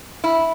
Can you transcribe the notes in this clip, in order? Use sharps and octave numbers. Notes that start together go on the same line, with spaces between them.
E4